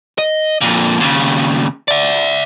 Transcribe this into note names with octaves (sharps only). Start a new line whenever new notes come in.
D#5
F2 A#2
D#2 C#3
D5 E5